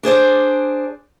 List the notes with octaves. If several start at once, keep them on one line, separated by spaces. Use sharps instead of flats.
D4 G#4 C5 D5